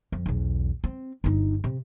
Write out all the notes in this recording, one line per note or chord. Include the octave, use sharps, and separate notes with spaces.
F2
B1 E2
C4
G1 D#4
C3